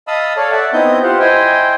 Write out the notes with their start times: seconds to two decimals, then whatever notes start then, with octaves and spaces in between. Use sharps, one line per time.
0.08 D#5 F5 A5 B5 D#6 E6
0.37 A4 C#5 D5 F5 A5
0.51 D5 E5 F#5 A5
0.73 B3 C4 D#4 E4 D#5 G6
1.03 F4 G4 C5 F#5
1.19 E4 C5 D#5 G5 G#5